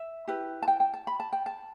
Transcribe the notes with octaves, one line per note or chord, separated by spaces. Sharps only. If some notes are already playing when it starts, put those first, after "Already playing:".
Already playing: E5
E4 G4 B4
A5
G5
G5
A5
B5
A5
G5
A5